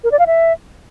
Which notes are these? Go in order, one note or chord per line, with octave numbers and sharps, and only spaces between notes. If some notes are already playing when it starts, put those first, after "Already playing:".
A#4
D5
F5
E5